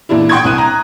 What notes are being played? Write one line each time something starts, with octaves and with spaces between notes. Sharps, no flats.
A#2 E3 D4 E4
F#5 G5 C6 C#6 D#6 G#6
C2 C4 F#6 D#7
A#5